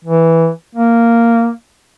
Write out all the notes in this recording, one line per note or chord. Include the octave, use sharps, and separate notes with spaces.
E3
A#3